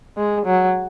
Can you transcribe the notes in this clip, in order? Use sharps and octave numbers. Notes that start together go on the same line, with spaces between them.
G#3
F#3